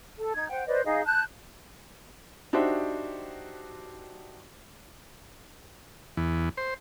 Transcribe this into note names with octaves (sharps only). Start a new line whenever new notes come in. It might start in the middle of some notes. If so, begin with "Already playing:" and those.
A4
D#4 G#6
C5 F#5 G5
B4 C5 D5 D#5
D#4 G#4 D#5 F5
A5 F#6 G6
D4 D#4 F#4 G4 C5 E5
E2
C5